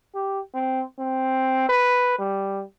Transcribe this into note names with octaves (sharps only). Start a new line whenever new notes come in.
G4
C4
C4
B4
G3